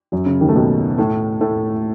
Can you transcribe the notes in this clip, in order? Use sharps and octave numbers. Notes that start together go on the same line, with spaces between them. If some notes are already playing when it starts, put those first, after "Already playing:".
F#2 F#3
C#3
D#2 D#3
A3
B2 B3
A2 A3
A2 A3